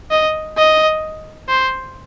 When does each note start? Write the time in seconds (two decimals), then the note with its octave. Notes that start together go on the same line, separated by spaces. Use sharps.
0.11 D#5
0.57 D#5
1.49 C5